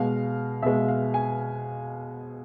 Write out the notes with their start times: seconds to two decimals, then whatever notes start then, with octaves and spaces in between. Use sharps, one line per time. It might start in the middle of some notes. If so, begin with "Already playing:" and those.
Already playing: B2 G#3 F5
0.63 B2 G#3 E5
0.88 F5
1.14 G#5